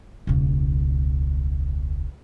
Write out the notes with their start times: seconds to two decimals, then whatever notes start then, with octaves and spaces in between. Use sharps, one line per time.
0.27 E1 C#2